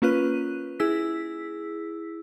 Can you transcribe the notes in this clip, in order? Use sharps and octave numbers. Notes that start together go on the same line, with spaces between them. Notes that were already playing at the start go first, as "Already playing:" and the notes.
A#3 C#4 F4 B4 F#6 D#7
E4 G#4 E6 B6